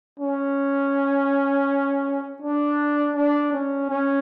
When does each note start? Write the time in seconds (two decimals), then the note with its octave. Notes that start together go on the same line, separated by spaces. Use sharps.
0.20 C#4
2.42 D4
3.16 D4
3.53 C#4
3.90 C#4